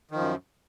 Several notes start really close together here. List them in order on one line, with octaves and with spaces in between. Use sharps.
D#3 F3 F#2